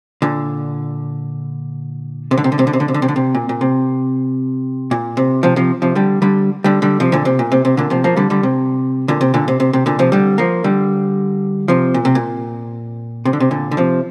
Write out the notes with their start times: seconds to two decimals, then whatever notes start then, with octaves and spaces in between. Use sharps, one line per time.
0.22 A#2 D3
2.31 C3
2.38 D3
2.44 C3
2.52 D3
2.59 C3
2.67 D3
2.73 C3
2.80 D3
2.88 C3
2.94 D3
3.02 C3
3.08 D3
3.16 C3
3.35 A#2
3.49 A#2
3.61 C3
4.91 A#2
5.17 C3
5.43 C3 F3
5.56 C3 F3
5.82 C3 F3
5.95 D3 G3
6.22 D3 G3
6.64 D3 G3
6.82 D3 G3
7.00 C3 F3
7.12 A#2 D3
7.25 C3
7.39 A#2
7.52 C3
7.65 C3
7.77 A#2 D3
7.90 C3 F3
8.04 F3 A#3
8.17 D3 G3
8.30 D3 G3
8.43 C3
9.08 A#2 D3
9.21 C3
9.34 A#2 D3
9.48 C3
9.60 C3
9.73 C3
9.86 A#2 D3
9.99 C3 F3
10.12 D3 G3
10.38 F3 A#3
10.64 D3 G3
11.68 C3 F3
11.94 A#2
12.05 C3
12.15 A#2
13.25 C3
13.33 D3
13.40 C3
13.51 A#2 D3
13.71 D3
13.77 C3 F3